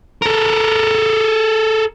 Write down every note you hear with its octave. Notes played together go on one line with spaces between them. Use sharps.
A4 A#4